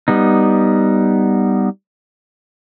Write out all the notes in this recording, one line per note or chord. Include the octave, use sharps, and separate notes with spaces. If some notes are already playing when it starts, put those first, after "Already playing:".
G3 B3 D#4